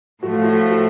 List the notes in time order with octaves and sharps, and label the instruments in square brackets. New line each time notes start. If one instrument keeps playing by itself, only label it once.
[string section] A2 F3 A3 [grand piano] F#4
[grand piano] F4
E4 F#4
F#4